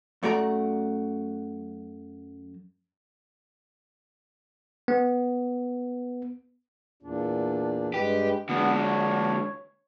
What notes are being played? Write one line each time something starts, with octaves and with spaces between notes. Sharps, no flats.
F#2 A3 F#4 D5 A#5
B3
E2 A#2 D4
G2 G#3 G4 B4
D3 G#3 B3 D4 F#4
C#5